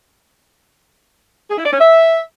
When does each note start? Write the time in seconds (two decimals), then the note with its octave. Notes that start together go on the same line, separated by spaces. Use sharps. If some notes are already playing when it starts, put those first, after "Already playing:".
1.50 G#4
1.58 E4
1.65 D5
1.73 C#4
1.80 E5